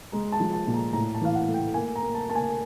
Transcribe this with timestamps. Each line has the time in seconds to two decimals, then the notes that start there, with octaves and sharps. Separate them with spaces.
0.12 G#3 A#5
0.32 A5
0.40 F3
0.53 A5
0.67 A#2
0.74 A#5
0.93 A2 A#5
1.15 A5
1.21 E3 F5
1.35 F#5
1.47 A3
1.54 G5
1.74 A#3 G#5
1.96 A#5
2.02 A#3
2.15 A5
2.29 A#3 A5
2.35 G#5